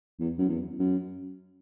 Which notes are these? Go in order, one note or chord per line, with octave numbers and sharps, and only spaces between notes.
E2
F#2
E2
F#2